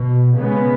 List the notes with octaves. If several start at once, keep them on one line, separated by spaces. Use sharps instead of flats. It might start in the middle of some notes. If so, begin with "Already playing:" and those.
Already playing: B2
C#3 G#3 B3